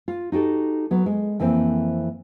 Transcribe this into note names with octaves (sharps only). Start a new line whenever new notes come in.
F4
D#4 F#4 G4 A4
F#3 B3
G#3
F2 E3 A#3 C4